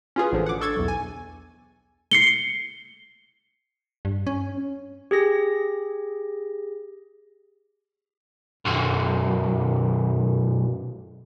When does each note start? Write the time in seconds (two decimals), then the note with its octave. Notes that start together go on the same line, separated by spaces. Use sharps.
0.16 C#4 F4 G#4 B4
0.32 A1 D3 F3
0.46 F#5 D6
0.61 D4 A4 C#6 G#6 A6
0.76 B1 E2
0.88 G#5
2.11 C7 C#7 G7
4.05 G2
4.27 C#4
5.11 G4 G#4 A#6
8.65 B1 F#2